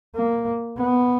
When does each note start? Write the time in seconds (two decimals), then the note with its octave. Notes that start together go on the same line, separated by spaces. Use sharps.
0.15 A#3
0.77 B3